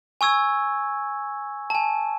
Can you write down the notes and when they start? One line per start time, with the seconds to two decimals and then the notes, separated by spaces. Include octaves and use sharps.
0.21 G#5 C#6 E6 G#6
1.70 G#5 A5